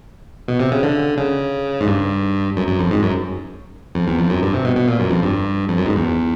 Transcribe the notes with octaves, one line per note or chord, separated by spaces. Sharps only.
B2
C3
C#3
D3
C#3
G#2
G2
F#2
F#2
F2
G#2
F#2
F2
E2
F2
F#2
G2
C3
B2
B2
A#2
F#2
F2
G2
F2
F#2
G#2
E2